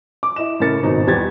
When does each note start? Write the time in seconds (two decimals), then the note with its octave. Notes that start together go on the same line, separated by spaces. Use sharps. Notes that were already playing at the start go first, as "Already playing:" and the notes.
0.23 D6
0.36 E4 D#5 E7
0.60 A2 C#3 A#4 A6 C#7
0.83 G#1 B2 D#4 A#5
1.07 E2 G3 G4 G#6 A6